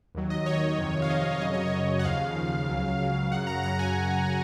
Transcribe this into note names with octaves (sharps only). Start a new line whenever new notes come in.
D#2 D#3 F#3
D#5
D#2 D#3 F#3 C#5
F2 C3 D#3
F5
F2 C3 D#3 D#5
F#2 C#3 F#3 D#5
C#5
D#5
F#2 C#3 F#3
F#5
D#2 C#3 F3 F5
D#2 C#3 F3
C#2 C#3 F#3
C#2 C#3 F#3
F#2 C#3 F#3 F#5
A#5
F#2 C#3 F#3 A#5
A#5
G#5